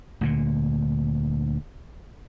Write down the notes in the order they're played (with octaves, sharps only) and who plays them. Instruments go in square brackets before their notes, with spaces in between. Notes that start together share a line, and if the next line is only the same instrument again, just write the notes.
[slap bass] D2 A#2 D3